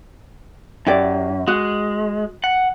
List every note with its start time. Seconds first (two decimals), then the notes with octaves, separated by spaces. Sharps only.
0.87 F#2 E4 G4 D5
1.48 G#3 F#4
2.44 F#5